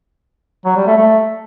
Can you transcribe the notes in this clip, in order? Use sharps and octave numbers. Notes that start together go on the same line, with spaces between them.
F#3
G3
A3
A3